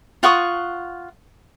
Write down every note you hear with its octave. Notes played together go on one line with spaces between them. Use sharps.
F4 F#5 C#6 D#6